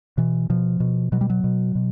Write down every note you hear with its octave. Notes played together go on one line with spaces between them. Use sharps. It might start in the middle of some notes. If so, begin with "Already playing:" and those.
B2 E3
B2 F3
B2
B2 F#3
G3
F#3
B2
B2